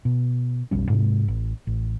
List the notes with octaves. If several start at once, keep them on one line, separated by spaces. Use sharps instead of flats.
B2
F1 B1 G3 C#4
G#2 C3 G#3
A1
A1